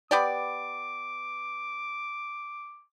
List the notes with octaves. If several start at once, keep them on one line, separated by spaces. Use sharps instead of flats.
B3 G4 D5 D6